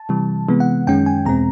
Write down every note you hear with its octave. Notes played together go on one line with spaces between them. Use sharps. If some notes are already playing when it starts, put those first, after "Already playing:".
Already playing: A5
C3 E3 G3
C3 E3 G#3 B3
F#5
F#2 D#3 G#3 C#4 G5
G#5
E2 B2 G#3 C4 A#5